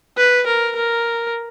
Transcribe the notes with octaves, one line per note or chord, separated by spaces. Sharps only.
B4
A#4
A#4